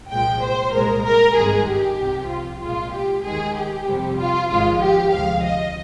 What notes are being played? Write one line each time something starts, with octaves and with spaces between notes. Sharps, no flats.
C2 A#2 F3 G#3 G5
C5
C2 A#2 G#3 A#4
A#4
G#1 G2 D#3 G#3 G#4
G4
C2 C3 F3
F4
C2 A#2 G#3 F4
G4
D#2 D#3 G#3 G#4
G4
F2 C3 G3
F4
G#1 G#2 F3 G#3 F4
G4
D2 C3 F3 G#3 F5
D#5